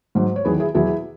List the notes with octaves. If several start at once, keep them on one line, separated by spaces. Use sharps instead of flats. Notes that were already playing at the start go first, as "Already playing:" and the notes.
G#2 F#3
C#5
E2 D#3 F#3 G#4 B4
E4 G#4
E2 B2 F#3 E4 G#4